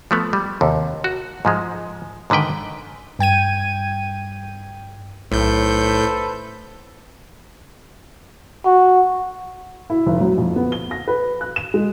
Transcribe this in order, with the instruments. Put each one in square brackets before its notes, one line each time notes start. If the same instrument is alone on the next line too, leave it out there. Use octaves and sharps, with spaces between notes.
[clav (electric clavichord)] F3 A3 B3
G3
D#2 C3
F#4
G#2 F3 G#3
G#2 D3 D#3 B4 G5
[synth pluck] G2 G5 G#6 D#7
[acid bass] B1 [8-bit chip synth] A2 G6 [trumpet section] A4 B4 C5
[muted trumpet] F#4
[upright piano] E4
F1
F#3
F2
B3
G7
A#6
B4
F#6
E7
G#3